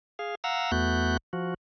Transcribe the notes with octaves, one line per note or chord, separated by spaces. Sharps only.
G#4 F5
F5 F#5 A#5 E6
E2 A3 B3 F#4 F#6 G6
F3 F#4